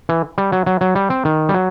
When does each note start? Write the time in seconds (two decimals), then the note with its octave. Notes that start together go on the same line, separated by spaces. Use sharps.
0.09 E3
0.38 G3
0.52 F#3
0.66 F#3
0.81 F#3
0.95 G3
1.10 C4
1.25 D#3
1.49 G3
1.54 F#3